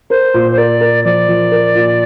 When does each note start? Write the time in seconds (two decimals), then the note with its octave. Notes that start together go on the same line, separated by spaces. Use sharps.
0.10 A#4 C5
0.34 A#2
0.51 C5
0.57 A#4 D5
0.81 A#4
1.04 F3 D5
1.28 F3
1.52 A#4
1.75 A#2